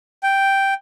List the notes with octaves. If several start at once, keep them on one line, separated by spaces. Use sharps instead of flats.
G5